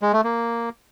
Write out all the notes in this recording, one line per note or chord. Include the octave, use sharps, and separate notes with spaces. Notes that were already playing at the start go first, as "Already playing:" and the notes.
G#3
A3
A#3